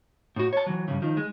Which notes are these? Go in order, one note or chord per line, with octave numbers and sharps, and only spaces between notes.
A2 F#4
C#5 A5
E3 F#3
G2 C#3
D#3 F3
G#3